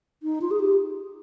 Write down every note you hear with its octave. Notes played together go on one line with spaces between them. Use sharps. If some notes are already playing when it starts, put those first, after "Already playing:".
D#4
F4
G#4
G4